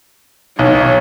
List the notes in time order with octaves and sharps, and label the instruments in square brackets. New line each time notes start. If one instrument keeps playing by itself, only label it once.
[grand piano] B1 [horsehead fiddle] C#5